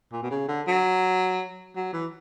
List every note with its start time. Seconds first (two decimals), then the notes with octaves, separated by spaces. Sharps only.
0.12 A#2
0.22 B2
0.31 C#3
0.48 D3
0.67 F#3
1.76 F#3
1.93 E3